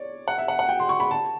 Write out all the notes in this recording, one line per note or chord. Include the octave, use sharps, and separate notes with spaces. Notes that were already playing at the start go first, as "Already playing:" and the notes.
Already playing: C#5 D5
F#5
E5
F#5
F#5
G5
C6
C#6
B5
A5